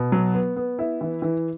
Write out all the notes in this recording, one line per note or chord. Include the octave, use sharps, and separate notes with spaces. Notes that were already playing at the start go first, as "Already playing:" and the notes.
Already playing: B2
F#3
B3
B3
E4
E3
E3